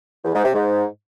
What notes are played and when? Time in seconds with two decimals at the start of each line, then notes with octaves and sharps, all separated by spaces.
0.24 E2
0.34 G#2
0.44 C3
0.54 G#2